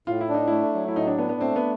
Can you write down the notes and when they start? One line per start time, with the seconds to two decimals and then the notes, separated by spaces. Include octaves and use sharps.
0.07 A2 F4
0.21 E4
0.29 D4 D#4
0.48 A3 E4
0.74 F#3
0.88 E4
0.96 A2 D#4
1.07 D4
1.18 B3 D4
1.29 B3
1.41 A3 C4
1.56 B3